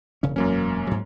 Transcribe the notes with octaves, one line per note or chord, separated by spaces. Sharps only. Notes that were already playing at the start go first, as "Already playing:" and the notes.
E1 C#3 C#4
E1 F#2 F#3 A#3 C#4
G#2 F#3